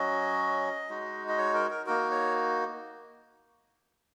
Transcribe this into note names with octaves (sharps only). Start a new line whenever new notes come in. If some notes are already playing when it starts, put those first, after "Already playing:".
Already playing: F#3 C#4 F#4 D#5
G#3 D#4 F#4
D#5
C#5
A#4
A#4
A#3 D#4 F#4 A#4
C#5